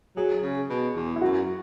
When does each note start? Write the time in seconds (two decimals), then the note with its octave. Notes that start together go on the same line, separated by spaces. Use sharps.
0.17 F#3 G#4
0.43 C#3
0.69 B2
0.96 E2
1.16 E4
1.21 F#2 F#4